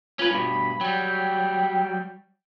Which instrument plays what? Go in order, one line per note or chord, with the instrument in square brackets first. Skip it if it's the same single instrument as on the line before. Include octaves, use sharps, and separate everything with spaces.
[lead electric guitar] C#4 B4 [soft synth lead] F4
[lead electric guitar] G2 B2 [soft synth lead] B5
[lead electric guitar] F#3 G3 [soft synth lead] G5